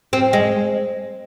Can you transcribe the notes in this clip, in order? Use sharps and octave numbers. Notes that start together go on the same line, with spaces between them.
C4
G#3